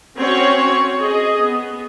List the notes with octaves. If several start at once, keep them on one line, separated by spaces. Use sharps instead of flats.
C4 C#4 F#4 C#5
G#4 D#5
B3